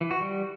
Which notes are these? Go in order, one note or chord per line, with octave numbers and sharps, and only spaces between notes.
E3
F#4
G3